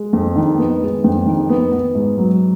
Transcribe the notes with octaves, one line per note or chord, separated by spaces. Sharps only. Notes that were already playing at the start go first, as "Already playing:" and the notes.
Already playing: G#3
F2
D#3
B3
G#3
F2
D#3
B3
B3
G#2
F#3